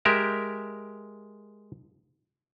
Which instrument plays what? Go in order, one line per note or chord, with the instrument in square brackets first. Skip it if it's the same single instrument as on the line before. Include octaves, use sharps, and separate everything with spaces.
[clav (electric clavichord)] G#3 G4 A#4 E5